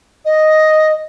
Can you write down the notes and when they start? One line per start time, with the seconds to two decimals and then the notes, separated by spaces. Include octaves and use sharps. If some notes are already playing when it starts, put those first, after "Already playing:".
0.25 D#5